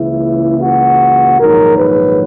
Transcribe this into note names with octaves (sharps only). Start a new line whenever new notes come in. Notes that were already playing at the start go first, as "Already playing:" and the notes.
Already playing: C#2 C#3 E3 A#3 E4
F#4
A#1 G#2 D#3 F#3 A#4
B4